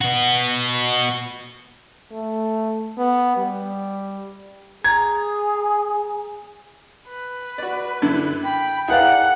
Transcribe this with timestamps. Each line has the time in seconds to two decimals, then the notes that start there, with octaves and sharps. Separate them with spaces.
0.01 B3 F#4
2.12 A3
2.98 B3
3.37 G3
4.84 G#4 A#5 G#6
7.08 B4
7.58 F#4 D5
8.02 F#2 D3 E4
8.44 G5 B5
8.88 E4 G#4 A#4 B4 D5 F5 F#5